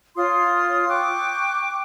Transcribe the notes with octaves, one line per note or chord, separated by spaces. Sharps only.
F4 C#5 C6 D#6
G5 C#6 D6 F#6